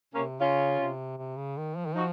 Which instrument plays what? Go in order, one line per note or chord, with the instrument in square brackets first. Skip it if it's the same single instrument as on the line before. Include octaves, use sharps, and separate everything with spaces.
[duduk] C3 [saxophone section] A#3 C#4
[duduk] C#3 [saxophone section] C#4 F4
[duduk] C3
C3
C#3
D#3
F3
D#3
[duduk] F3 [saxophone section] D#4 F#4